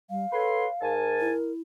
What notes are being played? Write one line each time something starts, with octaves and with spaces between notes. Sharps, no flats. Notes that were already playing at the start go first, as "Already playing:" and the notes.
G3 F5
A4 B4 C#5 C6
G#2 A#4 G#5 A5
E4